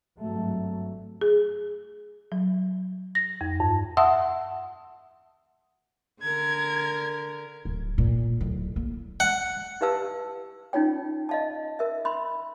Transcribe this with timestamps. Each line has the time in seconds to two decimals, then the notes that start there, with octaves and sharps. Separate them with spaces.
0.19 G#1 G2 F#3 A3
1.21 G#4
2.32 F#3
3.15 A#6
3.41 F2
3.60 G2
3.97 E5 F#5 A5 C6 D#6 E6
6.23 D3 A#4 G#6
7.65 D1
7.98 A#2
8.41 D1
8.76 A#3
9.20 F#5
9.81 E4 G4 B4 F5 A5 E6
10.73 C#4 D#4 F4 C#5 G5
11.29 D#5 F5 A5
11.79 A#4 E5
12.05 B5 C6